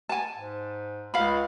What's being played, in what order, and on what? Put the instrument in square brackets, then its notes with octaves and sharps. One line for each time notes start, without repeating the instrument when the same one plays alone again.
[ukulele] G#5 A5
[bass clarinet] G#2
[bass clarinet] C#2 [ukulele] F5 B5